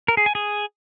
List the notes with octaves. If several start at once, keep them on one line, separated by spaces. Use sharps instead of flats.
A#4
G#4
G#5
G#4